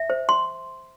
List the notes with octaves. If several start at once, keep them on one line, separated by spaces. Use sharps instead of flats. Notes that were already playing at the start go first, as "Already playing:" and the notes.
Already playing: E5
C5
C6